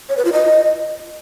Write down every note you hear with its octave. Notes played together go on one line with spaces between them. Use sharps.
C#5
B4
F4
D#5